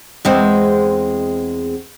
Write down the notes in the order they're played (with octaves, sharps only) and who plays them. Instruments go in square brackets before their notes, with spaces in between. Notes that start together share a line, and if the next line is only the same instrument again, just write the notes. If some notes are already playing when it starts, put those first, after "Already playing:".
[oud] E2 G#3 C4